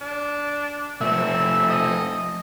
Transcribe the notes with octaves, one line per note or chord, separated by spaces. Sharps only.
D4
F3 A3 E5
D#5